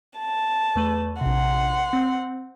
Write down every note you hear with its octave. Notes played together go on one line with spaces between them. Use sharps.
A5
E2 A3 B4
A#1 C3 F#5 C6
C4